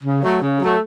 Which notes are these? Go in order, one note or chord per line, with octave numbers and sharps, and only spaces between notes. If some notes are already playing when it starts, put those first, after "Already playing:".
C#3
F#3 A3
C#3
F#3 A3